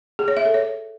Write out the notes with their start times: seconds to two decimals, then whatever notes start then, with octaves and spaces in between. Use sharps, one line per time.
0.19 G#4
0.28 C#5
0.37 E5
0.45 A4
0.54 C#5